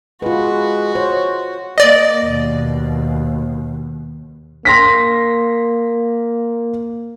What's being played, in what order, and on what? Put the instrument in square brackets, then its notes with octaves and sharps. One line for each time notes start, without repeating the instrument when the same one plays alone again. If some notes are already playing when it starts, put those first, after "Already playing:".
[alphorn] G#3 [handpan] F4 B4 [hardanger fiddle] F#4
[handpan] C5 [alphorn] C#5
[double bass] A#3 [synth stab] D5 D#5
[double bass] D#2 B2
[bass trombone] A#3 [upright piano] C6 A#6 B6